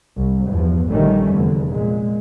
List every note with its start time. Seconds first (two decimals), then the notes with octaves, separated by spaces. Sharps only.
0.15 C2
0.48 E2 G2 F3
0.90 A#1 D3 D#3 G3 A3 C#4
1.31 F1 E2 D3
1.69 A#2 G#3